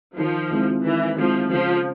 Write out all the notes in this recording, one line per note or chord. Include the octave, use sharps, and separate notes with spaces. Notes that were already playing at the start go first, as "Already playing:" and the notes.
D#3 F3
G#3 C4 E4
D#3 E3
F3 G#3 C4 E4
C#3 F3